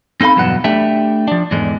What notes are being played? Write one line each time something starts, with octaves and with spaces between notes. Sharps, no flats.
C4 D#4 A4 F5 B5
E2 G2 B2 F#3 F#5
A3 D4 G4 E5
F3 D4
E2 G#2 D3 G#3